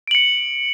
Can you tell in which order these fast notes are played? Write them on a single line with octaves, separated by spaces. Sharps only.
D7 F#7 C#7